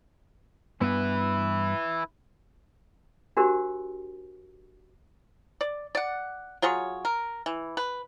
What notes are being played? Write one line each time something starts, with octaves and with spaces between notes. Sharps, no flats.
G2 B3 E4 B4
D4 F#4 G4 A#4 C5
D5
D5 F#5
F#3 F4 G#4 C#5
A#4
E3
B4